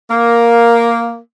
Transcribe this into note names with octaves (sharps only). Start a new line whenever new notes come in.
A#3